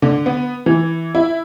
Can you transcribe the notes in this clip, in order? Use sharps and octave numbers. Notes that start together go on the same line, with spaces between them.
D3
B3
E3
E4